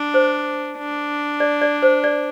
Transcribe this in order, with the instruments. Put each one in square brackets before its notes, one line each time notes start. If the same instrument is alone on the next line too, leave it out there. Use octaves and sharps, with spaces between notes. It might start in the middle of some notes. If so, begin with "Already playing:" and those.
Already playing: [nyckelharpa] D4
[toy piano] C5
[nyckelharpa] D4
[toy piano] D5
D5
C5
D5